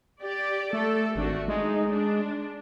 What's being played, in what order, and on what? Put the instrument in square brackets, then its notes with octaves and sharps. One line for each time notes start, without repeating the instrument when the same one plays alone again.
[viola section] G4 D5
[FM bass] A3 [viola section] A4
[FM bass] G#1 [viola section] A3 D4 F#4
[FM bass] G#3 [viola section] D#4
[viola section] D4